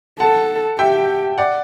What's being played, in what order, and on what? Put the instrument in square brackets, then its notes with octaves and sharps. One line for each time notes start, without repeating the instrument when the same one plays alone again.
[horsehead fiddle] A4 [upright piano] F#5 A5
[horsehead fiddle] G4 [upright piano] E5 G5
[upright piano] D5 F#5